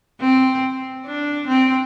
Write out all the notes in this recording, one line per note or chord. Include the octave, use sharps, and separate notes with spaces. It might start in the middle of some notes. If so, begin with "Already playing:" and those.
C4
D4
C4